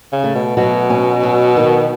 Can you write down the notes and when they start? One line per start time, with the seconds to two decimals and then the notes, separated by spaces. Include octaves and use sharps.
0.12 C#3
0.24 A3
0.35 B2
0.57 B2 F#3
0.90 C#4
1.23 F#3
1.57 D#3